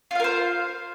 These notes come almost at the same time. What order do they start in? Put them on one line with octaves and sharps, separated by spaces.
F4 F5 A#4 C5